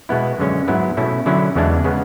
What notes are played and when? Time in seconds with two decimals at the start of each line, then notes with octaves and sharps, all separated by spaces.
0.09 B2 G#3 B3 E4
0.38 F#2 D3 G#3 C#4
0.68 G#2 F#3 B3 E4
0.97 B2 A3 C#4 E4
1.26 D3 F#3 C#4 E4
1.55 E2 C#3 E3 G#3 D4
1.84 C#3 G#3 B3